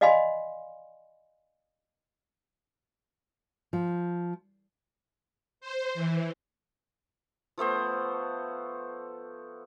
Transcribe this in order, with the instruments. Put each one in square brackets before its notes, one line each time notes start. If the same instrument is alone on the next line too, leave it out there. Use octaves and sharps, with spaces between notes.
[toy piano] D5 D#5 F5 G#5 B5 C6
[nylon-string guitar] F3
[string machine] C5
E3
[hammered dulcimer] F3 A3 B3 C5